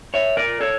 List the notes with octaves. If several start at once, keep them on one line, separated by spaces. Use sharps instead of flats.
C#5 E5
A#4 D5
A4 C#5